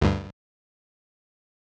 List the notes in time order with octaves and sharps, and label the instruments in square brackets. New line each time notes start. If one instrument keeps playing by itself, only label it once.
[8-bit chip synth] D2 G2